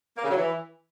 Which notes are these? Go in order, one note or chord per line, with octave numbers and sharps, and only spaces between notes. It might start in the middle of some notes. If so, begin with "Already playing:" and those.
A#3
C#3
F#3
E3